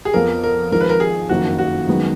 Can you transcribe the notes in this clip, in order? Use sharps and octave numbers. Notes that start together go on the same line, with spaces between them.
G#4
F2 F3 B3 A#4
A#4
G#1 G#2 F3 A#4
B4
A#4
G#4
F#1 F2 D#3 A#3 F#4
F#4
F#2 D#3 G#3 B3